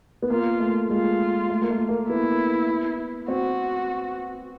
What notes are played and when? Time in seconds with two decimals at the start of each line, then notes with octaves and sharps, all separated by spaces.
0.22 B3
0.30 A#3 F4
0.60 A3
0.90 G#3 F4
1.50 A3
1.62 A#3
1.70 A3
1.89 A#3
2.09 B3 E4
3.28 C4 F#4